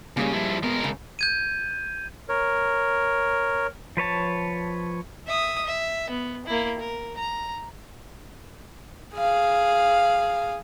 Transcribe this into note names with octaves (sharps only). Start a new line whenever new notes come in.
A#2 C#3 G3 G#3
F3 E4
B2 G#3 A#4
C#3
G6 G#6 D#7
A#4 C#5
F3 B4 C#5 A5
E5 D#6
E5
B3
A#3 E4
A#4
A#5
G#4 F5